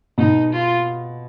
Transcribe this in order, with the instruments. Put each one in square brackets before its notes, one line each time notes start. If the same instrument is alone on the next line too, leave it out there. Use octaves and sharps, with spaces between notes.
[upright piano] B2 [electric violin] D#4
[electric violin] F4